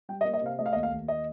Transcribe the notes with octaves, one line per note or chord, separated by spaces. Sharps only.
G3 G5
D#5
A#3
D#5
C3 F5
A3 D#5
F5
D#5
D#2
F5
D#2
D#5